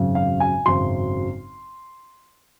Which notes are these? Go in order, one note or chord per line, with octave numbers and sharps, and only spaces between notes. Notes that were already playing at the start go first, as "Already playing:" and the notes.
Already playing: G#1 F#2 C#3 F#3
F5
G#5
G#1 F#2 C#3 F#3 C6